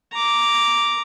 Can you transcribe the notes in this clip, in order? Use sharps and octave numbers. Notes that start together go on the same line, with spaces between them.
A#5 D6